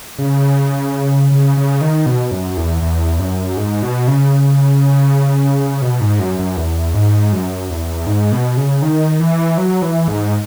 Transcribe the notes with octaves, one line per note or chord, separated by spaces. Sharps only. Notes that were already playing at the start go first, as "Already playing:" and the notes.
C#3
C#3
C#3
D#3
B2
F#2
E2
E2
F#2
G#2
B2
C#3
B2
G#2
F#2
F#2
E2
G#2
F#2
E2
G#2
B2
C#3
D#3
E3
F#3
E3
G#2